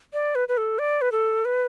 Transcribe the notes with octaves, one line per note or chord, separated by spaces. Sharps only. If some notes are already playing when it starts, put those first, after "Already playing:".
D5
B4
B4
A4
D5
B4
A4
B4